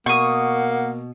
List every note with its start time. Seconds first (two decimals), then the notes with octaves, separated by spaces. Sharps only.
0.06 B2 A#3 F#5 C#6 D#6